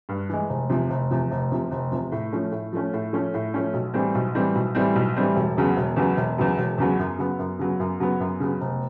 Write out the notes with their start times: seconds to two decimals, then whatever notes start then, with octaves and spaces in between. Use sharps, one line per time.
0.09 G2
0.29 E3 G#3
0.49 F1
0.70 E2 C3 F3
0.90 F1
1.11 E2 C3 F3
1.31 F1
1.51 E2 C3 F3
1.71 F1
1.91 E2 C3 F3
2.12 A2
2.33 F3 A3 C#4
2.52 A2
2.72 F3 A3 C#4
2.93 A2
3.13 F3 A3 C#4
3.34 A2
3.54 F3 A3 C#4
3.73 B1
3.94 A2 E3 G3 C4
4.15 B1
4.35 A2 E3 G3 C4
4.55 B1
4.75 A2 E3 G3 C4
4.95 B1
5.16 A2 E3 G3 C4
5.36 E1
5.57 E2 C#3 F#3 B3
5.77 E1
5.96 E2 C#3 F#3 B3
6.17 E1
6.38 E2 C#3 F#3 B3
6.58 E1
6.78 E2 C#3 F#3 B3
6.99 F#2
7.19 C#3 F#3 B3
7.39 F#2
7.59 C#3 F#3 B3
7.80 F#2
8.00 C#3 F#3 B3
8.20 F#2
8.40 C#3 F#3 B3
8.61 F1